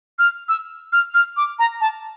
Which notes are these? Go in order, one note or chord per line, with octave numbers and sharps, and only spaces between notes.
F6
E6
F6
F6
D6
A#5
A5